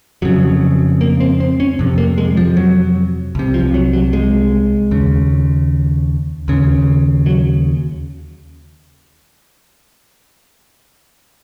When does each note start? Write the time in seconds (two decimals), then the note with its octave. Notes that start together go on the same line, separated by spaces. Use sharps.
0.22 F2 C#3 F#3
1.01 A#3
1.20 C4
1.40 C4
1.60 C#4
1.79 F2 C3
1.98 A#3
2.18 G#3
2.37 F3
2.57 F#3
3.35 C2 C3
3.54 F3
3.74 F#3
3.93 F#3
4.13 G#3
4.91 D#2 C#3
6.48 D#2 C#3
7.26 F#3